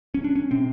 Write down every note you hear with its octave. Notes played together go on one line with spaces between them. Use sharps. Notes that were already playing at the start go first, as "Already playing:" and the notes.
C#4
D4
C#4
B2 C4